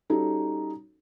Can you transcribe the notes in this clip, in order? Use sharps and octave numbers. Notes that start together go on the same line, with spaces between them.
G3 C#4 D#4 F#4 A4